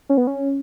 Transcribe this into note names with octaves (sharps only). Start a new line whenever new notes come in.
C#4
B3
C#4